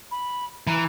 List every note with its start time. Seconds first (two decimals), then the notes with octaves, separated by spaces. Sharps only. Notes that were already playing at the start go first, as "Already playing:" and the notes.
0.11 B5
0.67 E3 A#5